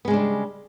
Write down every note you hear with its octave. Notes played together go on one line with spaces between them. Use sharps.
C#3 G3 G#3 B3 D4